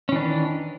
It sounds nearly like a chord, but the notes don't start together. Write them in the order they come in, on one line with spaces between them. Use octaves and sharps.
C#4 E3 D4 D#3